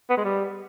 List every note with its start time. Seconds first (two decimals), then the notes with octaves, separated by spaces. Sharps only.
0.10 B3
0.17 G#3
0.25 G3